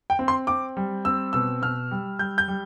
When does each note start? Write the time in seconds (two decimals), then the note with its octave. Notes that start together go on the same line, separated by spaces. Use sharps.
0.10 G5
0.19 C4
0.28 C6
0.47 C4 D6
0.77 G3
1.05 C4 E6
1.33 B2 E6
1.62 B2 F6
1.91 G3
2.19 G3 G6
2.38 G6
2.48 G3